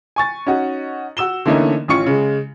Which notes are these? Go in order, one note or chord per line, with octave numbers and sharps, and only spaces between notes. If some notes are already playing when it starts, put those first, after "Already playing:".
G#5 C#6 A6
C#4 D#4 F#4
F#4 E6 E7 G7
D3 E3 A3 A#3 C#4 D#4
A1 C#4 F4 C#6 C#7
C#3 G#3